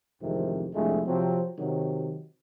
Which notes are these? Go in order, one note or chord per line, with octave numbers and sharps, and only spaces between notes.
A1 F2 G#2 C3 D#3
C2 F2 D3 G#3 A3
C3 F3 F#3 C4
C3 D#3 F#3